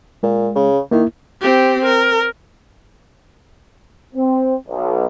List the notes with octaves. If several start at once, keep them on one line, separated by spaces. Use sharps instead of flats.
A#2 G#3
C#3
D#3 A#3 E4
C4 G4
A#4
C4
B1